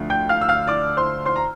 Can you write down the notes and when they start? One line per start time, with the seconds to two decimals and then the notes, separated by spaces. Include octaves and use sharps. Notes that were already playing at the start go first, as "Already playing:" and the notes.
Already playing: D2 D3 F3 A3
0.10 G5 G6
0.29 F5 F6
0.41 E6
0.49 F5 F6
0.67 D5 D6
0.97 C5 C6
1.25 C5 C6
1.36 A#5